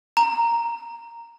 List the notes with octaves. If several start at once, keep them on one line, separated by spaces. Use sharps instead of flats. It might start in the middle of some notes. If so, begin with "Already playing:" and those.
A#5